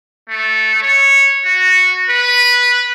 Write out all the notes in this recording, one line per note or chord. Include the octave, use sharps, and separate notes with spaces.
A3
C#5
F#4
B4